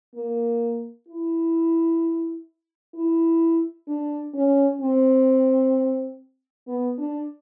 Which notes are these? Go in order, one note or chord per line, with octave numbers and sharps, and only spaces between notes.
A#3
E4
E4
D4
C#4
C4
B3
D4